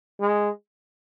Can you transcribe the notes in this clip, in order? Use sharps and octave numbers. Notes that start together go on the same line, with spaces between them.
G#3